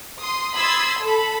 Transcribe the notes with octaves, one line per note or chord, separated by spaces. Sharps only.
C6 D#6
B5 C6 D#6 E6 G#6 A6
A4 B5